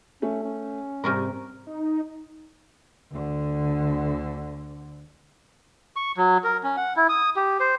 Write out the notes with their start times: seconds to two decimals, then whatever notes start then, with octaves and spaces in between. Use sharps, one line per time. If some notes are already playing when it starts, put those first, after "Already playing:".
0.22 A3 C#4
0.44 C#4
1.04 G#2 C3 G3 D#4 A#4 C#6 F6
1.67 D#4
3.11 D2 D3
5.96 C#6
6.17 F#3
6.44 A#4
6.63 C#4
6.77 F#5
6.96 E4
7.09 D#6
7.36 G4
7.60 C5